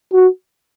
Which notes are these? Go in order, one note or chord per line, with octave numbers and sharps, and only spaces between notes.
F#4